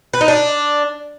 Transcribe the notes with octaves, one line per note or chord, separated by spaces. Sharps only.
B4
D#4
D4